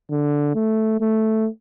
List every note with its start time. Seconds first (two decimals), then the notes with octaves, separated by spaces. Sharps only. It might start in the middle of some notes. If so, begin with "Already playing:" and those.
0.11 D3
0.55 A3
1.00 A3